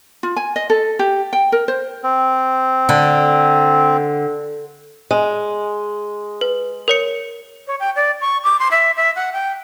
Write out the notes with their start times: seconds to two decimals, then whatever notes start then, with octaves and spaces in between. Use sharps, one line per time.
0.23 F4
0.36 G#5
0.56 D#5
0.70 A4
0.99 G4
1.33 G5
1.52 A#4
1.68 C5
2.03 C4
2.89 D3
5.11 G#3
6.41 B4
6.88 A#4 C#5 C#7
7.67 C#5
7.80 G5
7.96 D5
8.21 C#6
8.44 D6
8.59 C6
8.71 E5
8.97 E5
9.16 F#5
9.33 G5